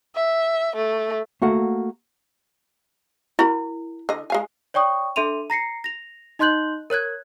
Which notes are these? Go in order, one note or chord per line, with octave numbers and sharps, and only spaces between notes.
E5
A3
A3 A#3 F#4 A4 F#5
E4 F#4 A#4 B5
D3 D#5
G#3 F5 G#5
C#5 D5 G5 C#6 D#6
D4 A4 E5 C6 D#7 F7
A#5 A#6 C7 C#7
A#6 F7
D#4 D#5 C6 F#6 G6 F#7
A#4 C#5 F#6 G#6